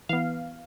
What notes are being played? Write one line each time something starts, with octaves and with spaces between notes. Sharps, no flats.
E3 B3 F5